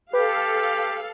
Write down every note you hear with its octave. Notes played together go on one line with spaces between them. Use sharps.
G4 A4 B4 F5